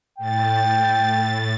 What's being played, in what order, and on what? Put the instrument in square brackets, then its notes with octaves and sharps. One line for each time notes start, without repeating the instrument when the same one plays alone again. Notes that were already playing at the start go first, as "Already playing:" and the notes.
[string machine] A2 A6 [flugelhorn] G5